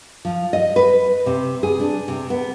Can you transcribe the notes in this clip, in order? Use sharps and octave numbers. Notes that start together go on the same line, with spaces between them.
F3
D#5
B4
C3
G#4
D4
C3
B3